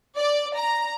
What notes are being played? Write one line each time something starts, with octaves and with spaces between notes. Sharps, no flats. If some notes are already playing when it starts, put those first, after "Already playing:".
D5
A#5